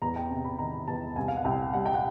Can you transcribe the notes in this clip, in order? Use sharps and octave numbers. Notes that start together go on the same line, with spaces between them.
E2 A#5
G5
C3 A5
B5
D#3 A#5
E2 A5
C2 G#5
F5
F#5
C2 G5
G3 F#5
G5
F#5